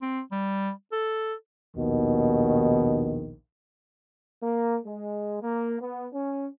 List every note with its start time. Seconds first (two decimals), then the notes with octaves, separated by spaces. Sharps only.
0.02 C4
0.32 G3
0.92 A4
1.76 A#1 D#2 B2 D#3
4.43 A#3
4.85 G#3
5.42 A#3
5.82 B3
6.14 C#4